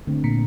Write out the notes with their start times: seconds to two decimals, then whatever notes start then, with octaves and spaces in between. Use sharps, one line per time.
0.07 D3 A3 C4
0.24 A#2